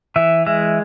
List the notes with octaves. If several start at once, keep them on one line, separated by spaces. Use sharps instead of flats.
E3 E5
G#3 E5